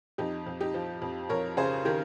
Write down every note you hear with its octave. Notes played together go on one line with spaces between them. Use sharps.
F2 D#4 G4
F2
D#4 G4
F3
F2
F2 A#4 C#5
C#3 G#4 C5
D#3 G4 A#4